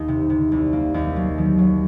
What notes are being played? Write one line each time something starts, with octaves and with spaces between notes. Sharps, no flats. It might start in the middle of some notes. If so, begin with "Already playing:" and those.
Already playing: D#2 D#4
C3
C3
C2
A#3
D#2
F#3
D#3
F#3